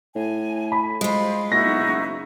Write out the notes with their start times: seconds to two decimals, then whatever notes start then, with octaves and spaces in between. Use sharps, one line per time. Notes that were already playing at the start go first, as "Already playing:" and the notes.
0.15 A2 G#5
0.72 B5
1.01 G#3 F4 C5
1.52 A#2 D#4 E4 F#4 A#6
1.65 B1
1.87 F#1